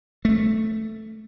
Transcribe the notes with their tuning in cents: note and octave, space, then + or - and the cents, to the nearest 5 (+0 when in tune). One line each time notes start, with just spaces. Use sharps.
A3 +0